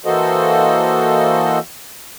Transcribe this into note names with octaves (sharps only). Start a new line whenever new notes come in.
E3 A#3 F#4 A4 C5 D#5